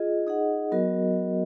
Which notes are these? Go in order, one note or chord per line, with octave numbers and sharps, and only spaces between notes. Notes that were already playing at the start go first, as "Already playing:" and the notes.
Already playing: F4 G#4 D#5
D#4 G#4 D#5 F#5
F#3 B3 F#4 A#4 D#5